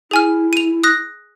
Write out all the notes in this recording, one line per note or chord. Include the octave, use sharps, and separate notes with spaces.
E4 G#4 G#5 F6
D#7 F7
D#6 F#6 A#6